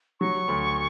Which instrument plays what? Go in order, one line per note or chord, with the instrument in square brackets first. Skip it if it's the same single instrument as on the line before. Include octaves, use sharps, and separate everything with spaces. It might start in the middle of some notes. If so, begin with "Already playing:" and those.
[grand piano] F#3 [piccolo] C#6
[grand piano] D2